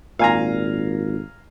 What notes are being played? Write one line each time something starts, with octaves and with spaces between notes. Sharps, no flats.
G#1 A#2 F5 G#5 A#5